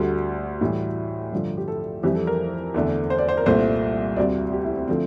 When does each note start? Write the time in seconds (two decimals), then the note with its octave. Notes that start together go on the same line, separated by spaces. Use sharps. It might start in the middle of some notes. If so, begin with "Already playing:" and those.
Already playing: D2 D3 G3
0.61 A2 E3 G3
1.32 G2 D3 F3
1.57 G4
1.68 A4
2.03 F2 E3 G3 G4
2.15 A4
2.27 A#4
2.74 E2 D3 A3
3.10 C5
3.18 D5
3.29 C5
3.37 A#4
3.46 C2 A#2 A3 C5
4.16 D2 C3 G3 D5
4.52 G4
4.65 E4
4.77 C4
4.88 D3 F3 A3 C4